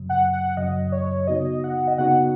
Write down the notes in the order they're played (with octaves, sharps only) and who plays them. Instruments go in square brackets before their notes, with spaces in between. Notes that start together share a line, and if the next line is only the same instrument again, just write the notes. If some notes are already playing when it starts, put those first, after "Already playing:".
Already playing: [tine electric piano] F#2 C#3 F#3
[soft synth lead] F#5
F#5
[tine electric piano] F#2 C#3 F#3 [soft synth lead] D#5
[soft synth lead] C#5
[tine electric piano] C#3 B3 D#4 F#4 [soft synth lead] D#5
[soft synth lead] F#5
D#5
[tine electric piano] C#3 B3 D#4 F#4 [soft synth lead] F#5